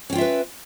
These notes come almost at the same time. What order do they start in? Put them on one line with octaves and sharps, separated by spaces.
C#4 G5 F4 E5 B4